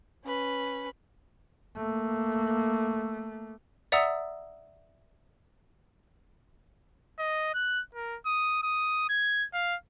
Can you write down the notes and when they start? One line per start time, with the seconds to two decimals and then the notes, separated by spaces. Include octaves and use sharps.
0.24 C#4 B4
1.77 A3 A#3
3.92 D5 E5 F#5 A#5 D#6 E6
7.19 D#5
7.54 F#6
7.95 A#4
8.26 D#6
8.63 D#6
9.09 G#6
9.54 F5